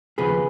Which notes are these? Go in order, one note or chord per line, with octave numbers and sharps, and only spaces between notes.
D#2 C#3 F3 B3 G#4 B4